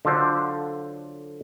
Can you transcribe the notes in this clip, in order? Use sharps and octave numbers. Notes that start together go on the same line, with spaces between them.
D3 F#3 F4 A4 C5 D5